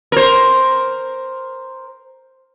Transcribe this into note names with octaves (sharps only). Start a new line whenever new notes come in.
A#4 C5